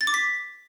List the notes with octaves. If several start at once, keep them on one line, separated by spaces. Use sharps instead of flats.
A6
D6
B6